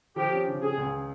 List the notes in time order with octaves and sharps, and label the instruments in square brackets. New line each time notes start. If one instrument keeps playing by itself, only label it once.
[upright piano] F3 [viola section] G4
[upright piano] C#4
C#3
[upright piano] C#3 [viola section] G#4
[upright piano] C#2